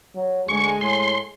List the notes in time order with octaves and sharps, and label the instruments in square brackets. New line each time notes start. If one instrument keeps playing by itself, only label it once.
[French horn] F#3
[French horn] D2 [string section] G#3 G#5 [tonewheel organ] C#6
[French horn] A2 [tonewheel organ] C6